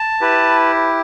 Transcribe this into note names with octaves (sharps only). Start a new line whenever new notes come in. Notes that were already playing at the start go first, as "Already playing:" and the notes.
Already playing: A5
E4 G4 B4